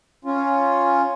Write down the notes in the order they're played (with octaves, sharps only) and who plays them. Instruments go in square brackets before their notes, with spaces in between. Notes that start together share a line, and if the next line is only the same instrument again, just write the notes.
[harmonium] C#4 F4